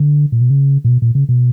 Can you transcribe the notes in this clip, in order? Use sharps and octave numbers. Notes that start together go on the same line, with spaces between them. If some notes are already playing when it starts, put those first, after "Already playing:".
Already playing: D3
A#2
B2
C#3
A#2
B2
A#2
C#3
B2